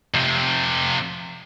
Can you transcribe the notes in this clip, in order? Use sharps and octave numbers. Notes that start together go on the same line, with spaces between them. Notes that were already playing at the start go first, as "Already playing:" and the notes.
F2 C3